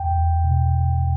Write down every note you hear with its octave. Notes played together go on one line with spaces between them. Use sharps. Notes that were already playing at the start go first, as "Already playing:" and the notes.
Already playing: E2 G5
E2
B2